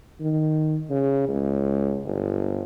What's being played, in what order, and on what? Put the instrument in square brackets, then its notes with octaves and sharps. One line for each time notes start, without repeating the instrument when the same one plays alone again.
[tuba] D#3
C#3
C#2
G1